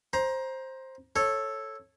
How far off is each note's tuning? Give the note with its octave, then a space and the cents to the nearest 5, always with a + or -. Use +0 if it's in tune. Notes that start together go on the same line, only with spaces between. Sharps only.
C5 +10 A#5 +20
A4 +0 C#5 -15